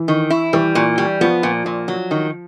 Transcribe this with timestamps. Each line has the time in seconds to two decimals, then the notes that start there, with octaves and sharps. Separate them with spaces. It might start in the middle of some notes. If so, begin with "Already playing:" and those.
Already playing: E3
0.08 D#3
0.30 E4
0.53 E3 G3
0.75 A#2
0.98 G3
1.21 F3 B3
1.43 A#2
1.66 A#2
1.88 F#3
2.11 D#3